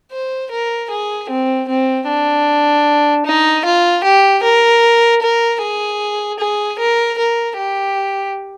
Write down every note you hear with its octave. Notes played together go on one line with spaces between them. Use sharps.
C5
A#4
G#4
C4
C4
D4
D#4
F4
G4
A#4
A#4
G#4
G#4
A#4
A#4
G4